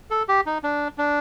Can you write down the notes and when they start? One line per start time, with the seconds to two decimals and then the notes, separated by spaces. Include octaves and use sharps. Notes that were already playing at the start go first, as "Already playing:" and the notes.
0.10 A4
0.28 G4
0.46 D#4
0.63 D4
0.98 D4